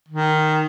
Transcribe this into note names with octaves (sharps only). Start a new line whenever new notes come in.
D#3